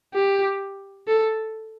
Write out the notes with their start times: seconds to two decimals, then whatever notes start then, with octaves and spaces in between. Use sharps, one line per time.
0.14 G4
1.08 A4